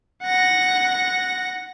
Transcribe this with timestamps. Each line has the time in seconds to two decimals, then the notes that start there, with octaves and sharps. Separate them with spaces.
0.23 F#5 A#6